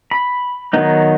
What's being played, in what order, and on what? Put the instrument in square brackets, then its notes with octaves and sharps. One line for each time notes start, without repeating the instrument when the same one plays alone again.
[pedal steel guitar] B5
D#3 F#3 B3 D#4